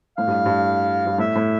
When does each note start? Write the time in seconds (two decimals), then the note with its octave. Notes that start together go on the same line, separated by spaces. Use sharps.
0.17 A2 F5
0.27 G2
0.45 G2
1.06 G2
1.18 A2 E5
1.36 A2